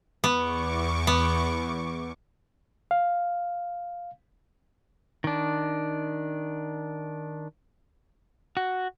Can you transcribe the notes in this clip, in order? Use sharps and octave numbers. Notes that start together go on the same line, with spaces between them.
E2 B3 C#6 D6
B3
F5
D#3 D4
F#4